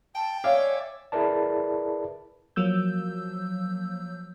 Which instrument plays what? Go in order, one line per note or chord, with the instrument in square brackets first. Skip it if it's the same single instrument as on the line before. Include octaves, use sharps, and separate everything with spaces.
[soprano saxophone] G5 [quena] A5
[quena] C#5 [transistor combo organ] D5 E5 G#5 [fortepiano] F5
[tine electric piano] E4 G#4 A#4 B4 D5 A5
[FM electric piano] F3 F#3 A#3 E6 G6